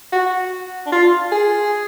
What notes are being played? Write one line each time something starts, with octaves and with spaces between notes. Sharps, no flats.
F#4
D4
F4
G#4